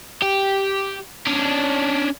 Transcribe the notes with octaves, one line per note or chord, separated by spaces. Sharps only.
G4
C#4 D4